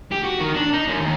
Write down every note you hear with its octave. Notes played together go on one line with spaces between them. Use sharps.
G4
F#4
D#3
D4
D#4
F#2
D#2